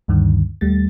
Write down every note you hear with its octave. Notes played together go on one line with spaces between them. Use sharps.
D2 G2 D3 D#3
D#2 G3 A3 A6